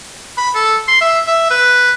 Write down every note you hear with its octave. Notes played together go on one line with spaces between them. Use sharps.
B5
A4
C6
E5
E5
B4